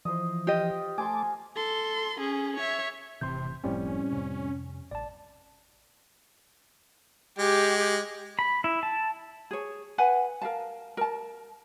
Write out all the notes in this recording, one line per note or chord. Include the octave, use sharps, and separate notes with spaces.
E3 F3 C5 D#5
F4 G4 D#5
A3 G#5 A5 C6 D6
A4 C6
C#4 G#4
C#5 E5
F1 A2 C3 E3 C6 G6
F#1 A2 F3 G3 C4 C#4
F2 C3
A1 D5 A5
G#3 G4
B5
E4
A5
G#4 C#5
B4 F#5 G#5
A#4 F5 A5
A#4 A5